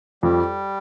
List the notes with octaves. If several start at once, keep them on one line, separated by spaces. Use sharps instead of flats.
F2 G3